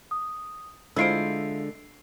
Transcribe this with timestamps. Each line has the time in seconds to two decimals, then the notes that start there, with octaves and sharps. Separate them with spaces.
0.11 D#6
0.96 D3 G#3 E4 F4 C5 E6 C7 D7